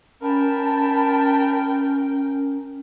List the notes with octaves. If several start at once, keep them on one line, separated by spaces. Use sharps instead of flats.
C#4 A#4 G5 A5 B5